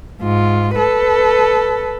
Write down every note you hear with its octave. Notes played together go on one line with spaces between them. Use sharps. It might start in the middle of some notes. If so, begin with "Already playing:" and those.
G#2 F4
A4 B4